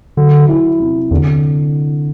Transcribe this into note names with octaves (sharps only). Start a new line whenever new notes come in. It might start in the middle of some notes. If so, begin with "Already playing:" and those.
D3 F#3
E4
C3
E2 D3